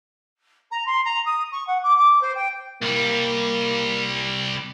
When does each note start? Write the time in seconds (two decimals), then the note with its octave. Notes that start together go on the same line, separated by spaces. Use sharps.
0.71 A#5
0.86 C6
1.04 A#5
1.25 D#6
1.52 C#6
1.67 F#5
1.82 D6
1.97 D6
2.21 C5
2.35 G5
2.82 C2 G3 A#3